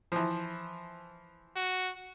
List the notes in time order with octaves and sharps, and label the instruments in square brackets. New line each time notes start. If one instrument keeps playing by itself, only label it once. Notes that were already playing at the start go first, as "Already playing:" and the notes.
[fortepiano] E3 F3
[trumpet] F#4